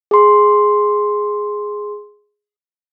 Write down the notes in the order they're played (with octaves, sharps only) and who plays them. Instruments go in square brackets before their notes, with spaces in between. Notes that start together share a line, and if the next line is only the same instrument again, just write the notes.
[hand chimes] G#4 C6